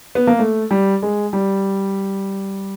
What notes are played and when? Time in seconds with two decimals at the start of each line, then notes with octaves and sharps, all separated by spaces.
0.15 B3
0.27 A#3
0.39 A3
0.71 G3
1.02 G#3
1.33 G3